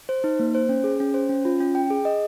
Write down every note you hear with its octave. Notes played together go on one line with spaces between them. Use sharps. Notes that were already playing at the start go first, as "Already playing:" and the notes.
C5
D#4
A#3
C5
C#4
G#4
C#4
C5
C#4
F4
C#4
G5
G#4
D#5